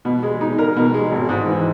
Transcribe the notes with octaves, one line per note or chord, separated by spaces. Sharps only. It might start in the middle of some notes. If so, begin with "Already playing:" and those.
B2
G#3
D#4
A#4
B2
G#3
G#1
G#2
E3